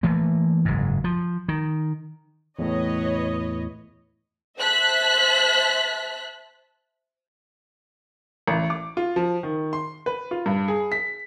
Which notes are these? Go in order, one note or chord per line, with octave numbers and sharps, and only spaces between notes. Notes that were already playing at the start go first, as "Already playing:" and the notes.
E3 A3 A#3
F#1 G#2
F3
D#3
E2 A2 B4 C#5 D#5
C5 E5 A5 F#6 B6
A1
D6
F4
F3
D#3
C6
B4
F4
G2
G#4
B6